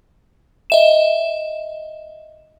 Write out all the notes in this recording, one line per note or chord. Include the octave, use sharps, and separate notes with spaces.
D#5 E5 E7